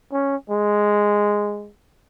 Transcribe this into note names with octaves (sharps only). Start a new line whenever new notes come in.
C#4
G#3